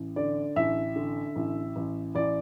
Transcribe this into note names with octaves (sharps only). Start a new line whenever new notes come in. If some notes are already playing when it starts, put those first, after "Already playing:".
Already playing: A1
D3 D5
A1 E5
D3
A1
A1
A1 D5